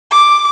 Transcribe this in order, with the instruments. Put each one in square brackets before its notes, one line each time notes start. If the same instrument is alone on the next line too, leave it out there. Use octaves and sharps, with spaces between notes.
[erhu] D6